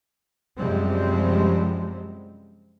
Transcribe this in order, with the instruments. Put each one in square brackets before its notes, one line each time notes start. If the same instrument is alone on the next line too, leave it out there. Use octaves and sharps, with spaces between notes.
[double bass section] F#2 C3 F3 G3 G#3 C4